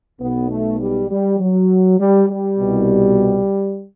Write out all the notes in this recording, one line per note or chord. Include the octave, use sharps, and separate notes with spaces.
B1 B2 B3
A3
G3
G3
F#3
G3
G3
C2 B2